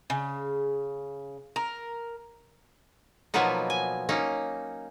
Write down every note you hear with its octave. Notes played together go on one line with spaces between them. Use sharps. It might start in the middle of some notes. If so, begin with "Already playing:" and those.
C#3
A#4
B2 F3 F#3 A#3 B3 D#4
G#5
A#3 C#4 D#4